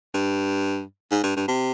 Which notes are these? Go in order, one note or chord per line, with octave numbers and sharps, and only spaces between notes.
G2
G#2
G2
G2
C3